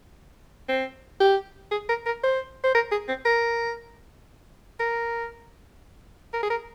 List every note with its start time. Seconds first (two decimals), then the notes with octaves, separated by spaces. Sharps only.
0.68 C4
1.20 G4
1.71 G#4
1.89 A#4
2.06 A#4
2.23 C5
2.64 C5
2.75 A#4
2.91 G#4
3.08 C4
3.25 A#4
4.80 A#4
6.33 A#4
6.43 G#4
6.50 A#4